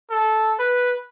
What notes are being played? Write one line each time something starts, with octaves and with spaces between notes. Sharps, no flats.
A4
B4